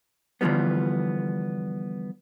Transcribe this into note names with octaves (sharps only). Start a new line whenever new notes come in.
D3 E3 F3 G3 B3